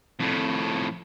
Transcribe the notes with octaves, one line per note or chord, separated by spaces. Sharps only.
F2 A2